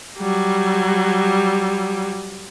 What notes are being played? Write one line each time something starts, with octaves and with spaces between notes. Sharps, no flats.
F#3 G3